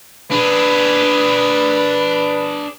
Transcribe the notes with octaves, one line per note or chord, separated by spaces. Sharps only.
D4 G#4 B4